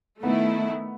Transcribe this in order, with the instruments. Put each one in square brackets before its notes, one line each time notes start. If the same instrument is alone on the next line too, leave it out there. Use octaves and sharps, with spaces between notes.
[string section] D#3 A3 E4 [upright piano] B3